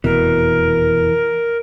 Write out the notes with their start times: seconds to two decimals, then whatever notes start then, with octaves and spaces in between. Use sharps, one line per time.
0.04 F1 E2 B2 E3 A#4